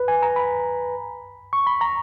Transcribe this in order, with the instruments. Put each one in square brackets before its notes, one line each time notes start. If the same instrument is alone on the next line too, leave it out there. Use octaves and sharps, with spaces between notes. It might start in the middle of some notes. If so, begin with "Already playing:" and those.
Already playing: [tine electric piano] B4
G#5
A#5
B5
C#6
B5
A#5